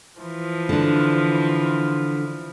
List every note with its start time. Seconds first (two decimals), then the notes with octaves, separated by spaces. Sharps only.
0.21 E3 F3
0.69 D3 D4